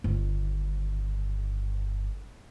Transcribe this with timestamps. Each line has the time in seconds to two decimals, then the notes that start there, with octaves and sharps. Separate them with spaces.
0.04 G1 D#3